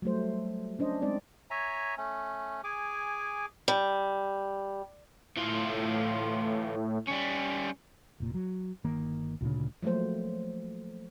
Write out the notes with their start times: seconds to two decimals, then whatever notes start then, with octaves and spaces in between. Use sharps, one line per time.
0.02 F#3 G3 A3 C5
0.79 C#4 D4 C5 D#5
1.02 G#3 C4 D#4 D5
1.50 C#5 E5 G#5 A#5
1.97 A3 C#4
2.64 G#4 G#5 D6
3.68 G3
5.37 A2 E3 F4
7.08 G3 C#4
8.20 F1 A#2
8.34 F#3
8.84 G1 D#3 A#3
9.41 D2 A#2 C#3 D4
9.83 F3 F#3 A3 A#3 C5